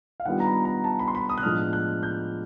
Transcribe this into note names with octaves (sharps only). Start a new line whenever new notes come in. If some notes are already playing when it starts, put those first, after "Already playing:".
F5
D#3 G3 B3 D4 F4 F#5
A#5
B5
A#5
A5
B5
C6
B5
D#6
F#6
A2 F3 G#3 B3 D4 F6
F#6
G6